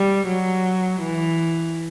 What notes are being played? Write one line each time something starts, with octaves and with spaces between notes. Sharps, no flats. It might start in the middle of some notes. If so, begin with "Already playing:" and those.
Already playing: G3
F#3
E3